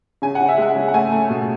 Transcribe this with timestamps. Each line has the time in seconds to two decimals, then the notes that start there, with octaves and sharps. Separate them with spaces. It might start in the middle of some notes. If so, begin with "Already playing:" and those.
0.22 C#3 G#5
0.35 F#5
0.41 C#3
0.49 E5
0.58 G#3 F#5
0.75 C#3
0.88 F#5
0.94 A3 G#5
1.12 A3
1.30 B2